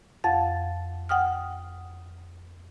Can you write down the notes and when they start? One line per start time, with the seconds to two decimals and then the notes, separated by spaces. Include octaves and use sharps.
0.24 F2 F5 F#5 A6
1.09 F#5 G5 D#6 F6